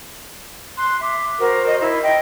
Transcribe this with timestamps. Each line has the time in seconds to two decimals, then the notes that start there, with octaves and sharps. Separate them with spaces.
0.77 C6 F#6
1.01 E5 D6
1.39 F#4 A#4 C5
1.66 D#5
1.81 E4
2.02 D#5 G5